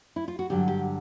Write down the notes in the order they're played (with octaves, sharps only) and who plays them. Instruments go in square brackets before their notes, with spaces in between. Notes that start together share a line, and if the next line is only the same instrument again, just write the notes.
[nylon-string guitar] E4
F4
F#4
G2 D3 F#3 G4
G4